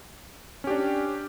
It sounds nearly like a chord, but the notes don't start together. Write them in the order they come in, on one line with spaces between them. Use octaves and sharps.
C#4 G4 D4